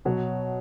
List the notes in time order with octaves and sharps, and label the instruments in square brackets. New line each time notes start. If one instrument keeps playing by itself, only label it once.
[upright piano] B2 [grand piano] F#3